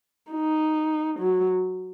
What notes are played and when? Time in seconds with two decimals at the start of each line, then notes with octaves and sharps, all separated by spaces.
0.31 D#4
1.19 F#3